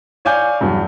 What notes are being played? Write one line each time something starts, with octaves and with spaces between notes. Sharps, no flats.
C#5 D5 F5 G#5 D6 G6
E2 G2 F#3